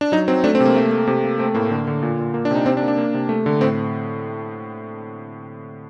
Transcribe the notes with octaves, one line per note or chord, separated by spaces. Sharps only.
D4
F#3 D#4
F#3 C4
A3 D4
C4
C3
A#3
A3
A3
C3
A#3
A3 C4
A2 A#3
D3
D3
A#2
A#2
A#3
D4
C3 D#4
C3 C4
D4
A#3
D4
A#3
C3
A3
D3
A2 C4